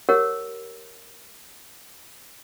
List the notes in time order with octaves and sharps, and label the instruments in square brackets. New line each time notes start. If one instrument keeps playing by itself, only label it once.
[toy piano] G4 A#4 C#5 F#5 E6